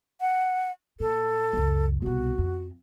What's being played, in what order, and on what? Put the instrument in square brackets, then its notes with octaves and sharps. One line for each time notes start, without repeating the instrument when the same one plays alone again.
[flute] F#5
[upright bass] A#2 [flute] A4
[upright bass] C#2 F#2
[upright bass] C2 B2 [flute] F#4
[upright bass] F2